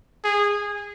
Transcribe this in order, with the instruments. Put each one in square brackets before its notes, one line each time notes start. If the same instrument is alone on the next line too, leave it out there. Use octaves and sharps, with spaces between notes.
[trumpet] G#4